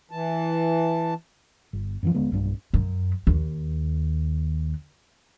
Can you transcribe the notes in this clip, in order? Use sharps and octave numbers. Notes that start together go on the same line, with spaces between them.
E3 A5
G1
F#2 E3 F3
D#1 D3 G#3 B3
B1 G2 G3
F#2
D#2